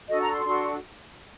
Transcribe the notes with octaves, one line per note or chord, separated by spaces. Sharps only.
D4 F#4 A4 D#5
A#5
C6
D4 F#4 A4 C6